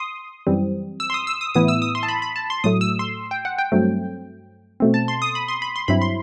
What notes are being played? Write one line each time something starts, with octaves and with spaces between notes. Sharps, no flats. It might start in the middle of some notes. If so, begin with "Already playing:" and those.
Already playing: C6 D#6
F#2 E3 G3 C4
E6
C6
D#6
E6
D#6
A2 E3 B3 E4 D#6
E6
D#6
C6
A5
B5
B5
A5
C6
A2 F#3 A3 D#6
E6
C6
G5
F#5
G5
G2 F#3 A3 C4
B2 A3 C4
A5
C6
D#6
B5
C6
B5
C6
G2 F#3 C4 E4 B5
C6